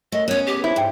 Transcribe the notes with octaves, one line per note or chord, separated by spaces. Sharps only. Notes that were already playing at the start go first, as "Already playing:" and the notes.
F#2 A3 D#5
B3 C#4 C#5
C#2 G4
G#2 C4 E4 B4
G#2 C4 D4 G5